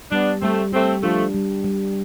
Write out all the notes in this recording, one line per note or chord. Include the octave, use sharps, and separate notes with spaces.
G3 B3 D4
G3 A3 C4
A3 C4 G4
F3 A3 D4
G3
G3